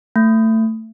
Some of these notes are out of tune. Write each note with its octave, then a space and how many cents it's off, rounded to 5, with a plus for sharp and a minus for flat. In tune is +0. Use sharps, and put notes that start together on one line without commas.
A3 +20